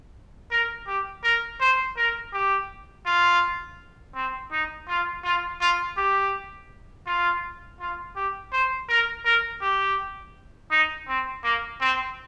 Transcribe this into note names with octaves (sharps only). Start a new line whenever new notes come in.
A#4
G4
A#4
C5
A#4
G4
F4
C4
D#4
F4
F4
F4
G4
F4
F4
G4
C5
A#4
A#4
G4
D#4
C4
A#3
C4